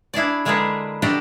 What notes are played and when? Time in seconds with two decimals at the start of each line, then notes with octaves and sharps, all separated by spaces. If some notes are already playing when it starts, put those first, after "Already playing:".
0.14 D4 E4 G#4 D5
0.45 D3 G#3 A#3 G#4 A4 B4
1.02 D4 F#4 G4 A4 D5 D#5